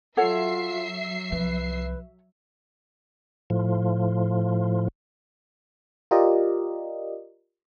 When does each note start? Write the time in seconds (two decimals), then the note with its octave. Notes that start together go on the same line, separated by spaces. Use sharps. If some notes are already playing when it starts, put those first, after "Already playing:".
0.17 F#3 F4 A4 C#5 E5 F#5 C7
1.32 C2 F3 B4
3.50 A2 F3
6.11 F4 G4 A#4 D5 D#5